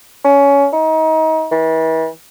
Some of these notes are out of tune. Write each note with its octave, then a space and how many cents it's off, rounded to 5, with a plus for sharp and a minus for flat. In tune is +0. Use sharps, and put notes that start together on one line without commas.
C#4 +20
D#4 +30
E3 -40